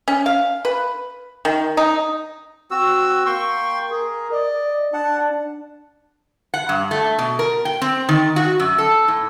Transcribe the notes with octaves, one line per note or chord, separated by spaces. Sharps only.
C#4
F5
B4
D#3
D#4
C4 F#4 E6
A#3 G5 C6 C#6
G#4 A#4
D5 D#5
D4 F#5 A5
F#5
G2
A3
B2
A#4
G5
C4
D#3
F#4
F#2
A4
A2